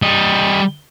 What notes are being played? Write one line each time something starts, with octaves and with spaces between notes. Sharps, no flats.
G3 D#5